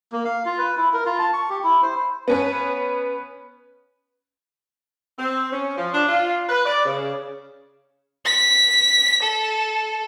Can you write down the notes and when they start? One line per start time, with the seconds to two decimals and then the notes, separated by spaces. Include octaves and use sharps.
0.12 A#3
0.25 F5
0.46 F4
0.58 B4
0.77 E4
0.94 A#4
1.06 F4
1.19 A5
1.33 C#6
1.50 G4
1.64 E4
1.83 C5
2.28 B3 C#4 B4
5.19 C4
5.53 C#4
5.78 F3
5.94 D4
6.09 F4
6.49 B4
6.66 D5
6.86 C#3
8.26 B6
9.22 A4